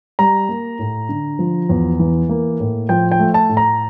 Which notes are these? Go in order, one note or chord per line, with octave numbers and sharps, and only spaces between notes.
G3 A#5
A#3
A2
D3
F3
E2
E3
A#3
A2
F3 G5
G5
A3
A5
A2
A#5